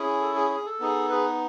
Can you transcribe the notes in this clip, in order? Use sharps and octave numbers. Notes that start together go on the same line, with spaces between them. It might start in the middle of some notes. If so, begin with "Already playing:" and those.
Already playing: C#4 E4 G#4
A4
G#4
G#4
A4
B3 D#4 G#4
G#4 B4